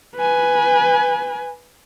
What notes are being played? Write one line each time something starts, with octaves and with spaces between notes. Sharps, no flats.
B4 G#5